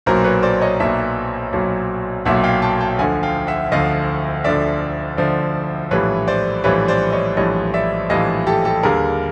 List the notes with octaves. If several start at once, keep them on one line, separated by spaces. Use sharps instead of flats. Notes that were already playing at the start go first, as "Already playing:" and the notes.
B1 A#2 F#3 A#4 C5
B4 C#5
C5 D5
C#5 D#5
B1 A#2 F#3 D5 E5
B1 A#2 F#3
B1 A#2 F#3 E5 F#5
F5 G5
G5 A5
G5 A5
D2 D3 F3 F#5 G#5
F5 G5
E5 F#5
D2 D3 F3 D#5 F5
D2 D3 F3 D5 E5
D2 D3 F3 C5 D5
A#1 A2 E3 G3 B4 C#5
C5 D5
A#1 A2 E3 G3 B4 C#5
C5 D5
C#5 D#5
A#1 A2 E3 G3 C#5 D#5
D5 E5
A#1 A2 E3 G3 D#5 F5
G4 A4
G4 A4
D#2 D3 G3 G#4 A#4